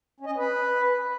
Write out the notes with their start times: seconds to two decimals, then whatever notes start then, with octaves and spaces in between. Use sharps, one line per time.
0.20 C#4
0.26 D#5
0.32 C#4
0.37 B4